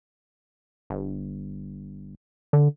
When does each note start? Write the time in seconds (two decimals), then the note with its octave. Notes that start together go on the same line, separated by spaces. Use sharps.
0.90 G1
2.53 D3